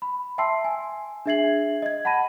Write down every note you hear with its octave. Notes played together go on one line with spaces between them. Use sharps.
B5
E5 G5 A5 C6 E6 C7
G#5
D4 G#4 E5 G#6 C7 F#7
D#5 G#6
F#5 A5 B5 A#6 D#7